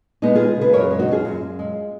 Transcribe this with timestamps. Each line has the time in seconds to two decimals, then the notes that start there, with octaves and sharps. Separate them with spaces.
0.22 G#3 B3 D#4
0.35 G#3 F4 G#4
0.57 C#3 G#4 B4
0.73 F#2 A#4 C#5
0.91 G#3
0.99 D#4 F#4
1.08 F#2 F4 G#4
1.25 F#2
1.42 F#2
1.59 G#3